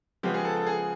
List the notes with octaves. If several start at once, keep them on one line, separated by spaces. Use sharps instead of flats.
C#3 F3 G#3 B3 G4
G#4
A4
A4
G#4